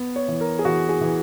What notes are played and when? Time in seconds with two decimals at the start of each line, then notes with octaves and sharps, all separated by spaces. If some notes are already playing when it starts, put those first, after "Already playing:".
Already playing: B3
0.16 C#5
0.28 E3
0.41 A#4
0.59 G#4
0.65 E3 F#4
0.89 G#4
1.01 E3